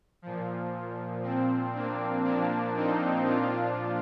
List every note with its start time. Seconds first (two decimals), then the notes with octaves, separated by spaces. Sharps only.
0.22 A#2 F3
1.23 A#2 F3 C4
1.74 A#3 D4
2.25 A#2 F3 A#3 D4
2.76 C4 D#4
3.26 A#2 F3 D4 F4